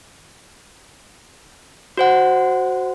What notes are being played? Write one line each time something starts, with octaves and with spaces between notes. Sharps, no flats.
F#4 C5 F#5